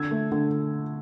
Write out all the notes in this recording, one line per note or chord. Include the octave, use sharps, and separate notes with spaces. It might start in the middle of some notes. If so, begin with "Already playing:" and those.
Already playing: D3 E6 G#6
A3
D3